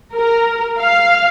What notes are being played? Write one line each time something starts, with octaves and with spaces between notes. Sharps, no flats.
A#4
F5